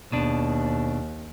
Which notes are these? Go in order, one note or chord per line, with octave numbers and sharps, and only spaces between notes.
D#2 B2 D4